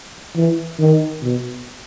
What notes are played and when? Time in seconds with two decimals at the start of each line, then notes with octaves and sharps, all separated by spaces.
0.35 E3
0.79 D#3
1.22 B2